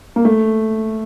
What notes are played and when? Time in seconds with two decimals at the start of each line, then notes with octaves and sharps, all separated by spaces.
0.16 A#3
0.25 A3